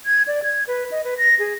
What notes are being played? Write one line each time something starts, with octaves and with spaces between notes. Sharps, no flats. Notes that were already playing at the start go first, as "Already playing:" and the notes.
G#6
D5
G#6
B4
D#5
B4
A#6
G#4